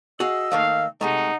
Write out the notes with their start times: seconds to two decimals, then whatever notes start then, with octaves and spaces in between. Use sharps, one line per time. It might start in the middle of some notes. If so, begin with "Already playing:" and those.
0.20 F#4 G#4 D#5 F5 E6
0.52 D#3 A3 A#3 F5
1.01 C3 G#3 A3 D#4 F#5